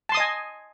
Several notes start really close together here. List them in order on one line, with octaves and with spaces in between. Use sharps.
A5 C6 D#6 D#5 G#5